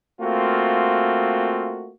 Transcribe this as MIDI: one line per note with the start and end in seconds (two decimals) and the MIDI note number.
0.21 1.92 57
0.21 1.92 58
0.21 1.92 60
0.21 1.92 65
0.21 1.92 66